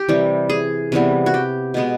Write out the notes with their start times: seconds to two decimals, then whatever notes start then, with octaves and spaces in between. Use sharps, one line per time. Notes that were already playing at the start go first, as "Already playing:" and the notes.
Already playing: G4
0.09 C3 E3 G3
0.49 G#4
0.92 C3 E3 G3 B3
1.26 F#4
1.34 G4
1.74 B2 G#3 B3